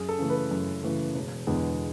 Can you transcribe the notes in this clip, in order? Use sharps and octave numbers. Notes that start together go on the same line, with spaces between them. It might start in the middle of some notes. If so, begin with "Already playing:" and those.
Already playing: F#2 G#4
A4
C#3 E3 A3
B4
F#2
C#3 E3 A3
E1
E2 D3 G#3 B3